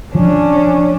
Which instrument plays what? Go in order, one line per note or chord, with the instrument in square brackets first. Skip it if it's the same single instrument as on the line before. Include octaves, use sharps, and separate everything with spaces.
[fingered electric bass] F3 [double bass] C#4 D4